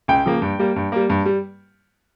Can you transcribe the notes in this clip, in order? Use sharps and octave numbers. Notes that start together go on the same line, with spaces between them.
C#2 G5
C#3 F3 A#3
G2
G3 A#3
G2
G3 A#3
G2
G3